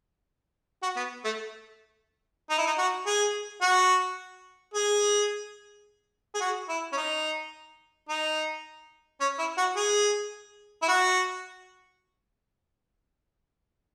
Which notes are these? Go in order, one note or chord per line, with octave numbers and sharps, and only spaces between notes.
F#4
B3
A3
D#4
E4
D#4
F#4
G#4
F#4
G#4
G#4
F#4
E4
C#4
D#4
D#4
C#4
E4
F#4
G#4
E4
F#4